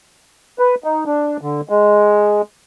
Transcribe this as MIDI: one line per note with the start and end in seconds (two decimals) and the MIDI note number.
0.59 0.75 71
0.84 1.04 63
1.06 1.37 62
1.41 1.61 50
1.69 2.42 56